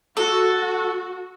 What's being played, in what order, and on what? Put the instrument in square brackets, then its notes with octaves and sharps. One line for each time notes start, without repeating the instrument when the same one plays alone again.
[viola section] F#4 [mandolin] A4